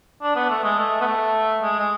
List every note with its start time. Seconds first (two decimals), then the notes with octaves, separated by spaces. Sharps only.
0.22 D4
0.36 B3
0.50 A3
0.64 G#3
0.78 A3
1.01 B3
1.07 A3
1.63 G#3
1.79 G#3